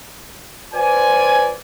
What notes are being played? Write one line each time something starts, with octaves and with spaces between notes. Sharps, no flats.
F4 B4 C5 D5 G#5